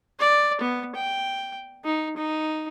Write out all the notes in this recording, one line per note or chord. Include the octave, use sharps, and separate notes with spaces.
D5
B3
G5
D#4
D#4